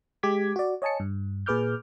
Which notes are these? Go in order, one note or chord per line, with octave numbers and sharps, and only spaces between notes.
G#3 G4 D6 G#6 B6
F#4 D5
C#5 D#5 G#5 A5 C#7
G2
A#2 G#4 B4 D6 F6 G6